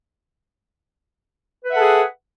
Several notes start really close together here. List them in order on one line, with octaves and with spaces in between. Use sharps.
B4 E5 F#5 A4 G#4